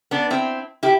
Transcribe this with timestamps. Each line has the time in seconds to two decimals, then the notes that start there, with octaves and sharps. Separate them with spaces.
0.11 B3 D4
0.30 C4 E4
0.83 E4 G4